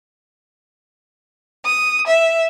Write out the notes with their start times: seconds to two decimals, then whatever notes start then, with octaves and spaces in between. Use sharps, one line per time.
1.65 D#6
2.06 E5